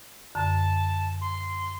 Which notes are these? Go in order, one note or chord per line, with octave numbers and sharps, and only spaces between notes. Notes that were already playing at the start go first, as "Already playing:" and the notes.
F#2 D3 A5
C6